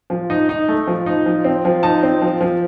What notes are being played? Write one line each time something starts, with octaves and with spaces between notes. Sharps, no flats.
F3
D#4
D#4
A3
F3
D#4
F3
C4
F3
D#4 A5
C4
F3
F3